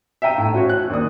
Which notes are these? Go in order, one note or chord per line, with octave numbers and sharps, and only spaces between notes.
E5 F5 G5 A#5 D#7
A2
C#4 F#4 C5 C#5
F#6
D#2 D5 D#6